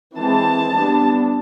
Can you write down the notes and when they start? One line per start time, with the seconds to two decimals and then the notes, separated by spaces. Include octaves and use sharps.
0.17 E3 G#3 C4 A5
0.74 G3 B3 D4